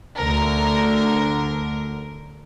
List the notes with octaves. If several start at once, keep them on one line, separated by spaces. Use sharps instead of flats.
D2 D3 A#4